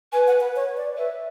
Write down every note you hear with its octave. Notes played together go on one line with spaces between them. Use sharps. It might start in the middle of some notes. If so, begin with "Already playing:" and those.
B4 G#5
F#5
B4
C#5
D5
B4 E5